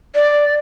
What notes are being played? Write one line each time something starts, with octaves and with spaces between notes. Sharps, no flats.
D5